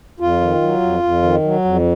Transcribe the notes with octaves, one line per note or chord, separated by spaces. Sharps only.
F2 F4
D#3
F#3
F2
F2
D#3
F#3
F2